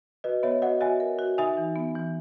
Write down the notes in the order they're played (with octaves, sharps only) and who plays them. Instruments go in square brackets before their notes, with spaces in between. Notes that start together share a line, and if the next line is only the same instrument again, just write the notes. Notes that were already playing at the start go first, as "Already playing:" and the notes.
[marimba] F#4 [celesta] B4 D#5
[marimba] B3 [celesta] C#5 E5
[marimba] F#4 [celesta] D#5 F#5
[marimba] F#4 [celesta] E5 G#5
[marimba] A#4
F#4
[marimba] D#4 [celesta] E5 G#5
[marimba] E3
B3
E3